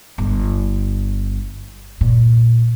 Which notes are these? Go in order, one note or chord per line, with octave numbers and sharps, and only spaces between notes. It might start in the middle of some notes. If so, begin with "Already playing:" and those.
G1
A#2